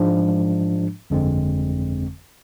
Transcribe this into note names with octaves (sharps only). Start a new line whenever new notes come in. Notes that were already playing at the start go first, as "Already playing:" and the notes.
Already playing: G#2 F3 G#3 D4
G1 F2 D3 G#3 C4